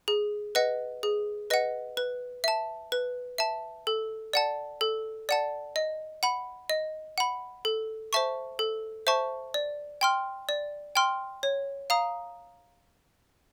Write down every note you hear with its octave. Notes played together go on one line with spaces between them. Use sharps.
G#4
B4 D#5 F#5
G#4
B4 D#5 F#5
B4
E5 A5
B4
E5 A5
A4
D5 F#5 A5
A4
D5 F#5 A5
D#5
F#5 B5
D#5
F#5 B5
A4
C5 E5 A5 C#6
A4
C5 E5 A5 C#6
D5
G5 C6 F6
D5
G5 C6 F6
C#5
F5 A#5 D#6